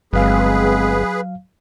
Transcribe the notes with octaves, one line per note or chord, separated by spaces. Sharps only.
G1 F#3 G#3 C4 G#4 B4 F5